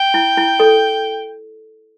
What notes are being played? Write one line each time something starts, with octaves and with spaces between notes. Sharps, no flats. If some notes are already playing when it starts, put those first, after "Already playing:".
Already playing: G5
E4
E4
A4